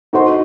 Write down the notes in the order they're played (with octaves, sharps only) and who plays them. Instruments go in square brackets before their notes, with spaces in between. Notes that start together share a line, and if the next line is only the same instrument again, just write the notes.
[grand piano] D#4 F#4 [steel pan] A4 C5 F#5 C6